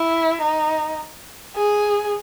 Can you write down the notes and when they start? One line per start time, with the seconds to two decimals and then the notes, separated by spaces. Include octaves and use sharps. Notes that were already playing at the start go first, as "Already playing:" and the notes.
Already playing: E4
0.41 D#4
1.56 G#4